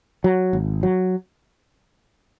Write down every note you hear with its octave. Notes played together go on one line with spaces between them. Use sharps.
F#3
G#1
F#3